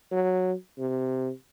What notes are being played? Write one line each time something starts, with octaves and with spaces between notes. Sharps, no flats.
F#3
C3